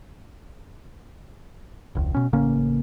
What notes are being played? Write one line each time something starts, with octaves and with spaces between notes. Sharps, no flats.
E1 C#2
B2 C#4
A1 C#3 A#3 C#4